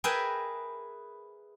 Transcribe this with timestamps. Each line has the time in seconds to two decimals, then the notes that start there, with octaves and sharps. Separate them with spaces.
0.04 G#4 A#4 B4 E5 G5 G#5